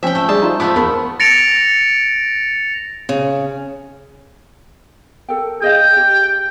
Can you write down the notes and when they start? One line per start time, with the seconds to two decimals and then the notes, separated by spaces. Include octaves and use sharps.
0.03 F3 C4 C#4 E5 G5
0.15 A3
0.29 G3 D4 G#4 A5
0.42 D#4 F4 C5
0.60 F3 A3 B3 D6
0.76 E2 A3 A#4 B5
1.20 A6 A#6 C#7 D7 F7
3.09 C#3
5.29 A4 A#4 G5
5.62 G#4 D#5 F5 G5
5.97 G4